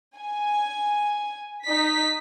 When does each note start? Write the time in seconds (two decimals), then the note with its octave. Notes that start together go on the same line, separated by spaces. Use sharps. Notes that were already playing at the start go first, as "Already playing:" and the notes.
0.17 G#5
1.63 D#4 B6